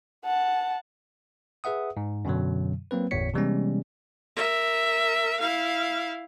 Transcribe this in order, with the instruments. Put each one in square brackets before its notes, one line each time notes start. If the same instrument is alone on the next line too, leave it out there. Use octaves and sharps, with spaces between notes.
[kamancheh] F#5 A5
[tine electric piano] G#4 B4 E5 F#5 D#6
G#2
F#2 B2 D3 F#3
F#3 A#3 C4 B4
G1 E2 A2 C#5 B6 C#7
C3 E3 G3 G#3 B3 C#4
[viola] A#4 E5
E4 F5